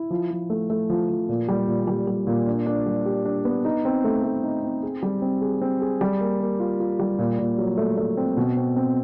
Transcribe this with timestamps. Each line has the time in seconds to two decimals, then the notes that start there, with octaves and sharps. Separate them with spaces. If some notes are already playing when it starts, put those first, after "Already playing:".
Already playing: E4
0.10 F3
0.31 F3
0.50 A3
0.70 A3
0.90 F3
1.09 F3
1.29 A#2
1.49 G3
1.68 A#2
1.88 G3
2.08 G3
2.27 A#2
2.47 D4
2.66 D4
2.86 G3
3.06 G4
3.25 D4
3.45 B3
3.65 D#4
3.85 C4
4.04 A3
4.24 A3
4.44 D#4
4.63 C4
4.83 G#4
5.03 G3
5.22 C4
5.42 G#4
5.62 C4
5.82 G#4
6.01 G3
6.21 A#3
6.40 A#3
6.60 F4
6.80 F4
6.99 G3
7.19 A#2
7.39 A#2
7.58 F#3
7.78 A3
7.97 A3
8.17 C4
8.37 B2
8.57 C4
8.76 C4